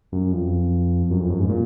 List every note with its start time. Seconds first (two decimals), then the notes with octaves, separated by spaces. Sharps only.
0.12 F#2
0.32 F2
1.10 F#2
1.20 F2
1.30 F#2
1.40 G#2
1.49 A#2